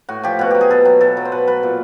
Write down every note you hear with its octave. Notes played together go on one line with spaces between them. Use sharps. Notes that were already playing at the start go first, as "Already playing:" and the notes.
A2 F#4
F3 G4
B2 F#4
F#3 G4
G#4
B2 A4
F#3
B2 A4
F#3
C5
B2 B4
F#3 B4
A#2